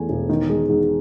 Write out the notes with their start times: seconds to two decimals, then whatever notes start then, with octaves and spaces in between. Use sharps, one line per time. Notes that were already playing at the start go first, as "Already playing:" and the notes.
Already playing: E2 A3 G#5
0.09 E1
0.29 D#3
0.49 G#3
0.70 G#2